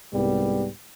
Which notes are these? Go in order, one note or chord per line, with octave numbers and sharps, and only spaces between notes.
C2 G#2 G3 B3